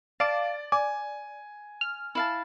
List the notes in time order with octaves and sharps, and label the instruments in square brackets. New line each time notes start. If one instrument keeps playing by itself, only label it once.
[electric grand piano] D5 [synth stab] F5 D6 [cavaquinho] A5
[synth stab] D5 [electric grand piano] G#5
[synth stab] F6
[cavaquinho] E4 F5 A5